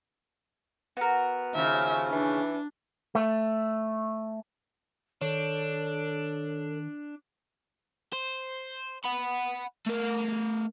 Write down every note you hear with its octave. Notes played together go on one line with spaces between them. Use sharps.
B3 F#4 A#4
D#2 C#3 F3 E5
E3 D4
A3
D#3 D4 A4 C#5 D7
C5
F#5 B5
A3 A#4